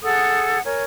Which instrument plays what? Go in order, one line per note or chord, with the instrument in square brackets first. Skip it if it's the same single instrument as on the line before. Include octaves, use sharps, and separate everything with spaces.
[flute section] G#4 A4 F#5 D#6
A#4 C#5 G#5